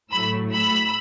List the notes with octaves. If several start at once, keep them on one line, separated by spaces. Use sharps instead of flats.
A2 F#3 A3 B5 E6
B5 E6